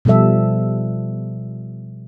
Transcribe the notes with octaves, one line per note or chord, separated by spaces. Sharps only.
B2 F3 G3 A4 E5